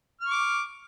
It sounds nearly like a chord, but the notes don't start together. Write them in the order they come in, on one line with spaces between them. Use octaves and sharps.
F6 C#6 D6